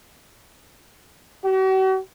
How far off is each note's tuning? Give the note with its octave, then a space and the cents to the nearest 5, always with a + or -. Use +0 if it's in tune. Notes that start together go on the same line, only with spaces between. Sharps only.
F#4 +45